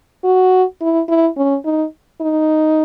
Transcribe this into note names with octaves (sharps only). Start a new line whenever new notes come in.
F#4
E4
E4
C#4
D#4
D#4